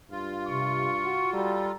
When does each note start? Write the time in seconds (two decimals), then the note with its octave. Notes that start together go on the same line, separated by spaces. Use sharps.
0.11 G2 F4
0.47 C3 C#6
1.03 F#4
1.34 G3 A4 A#5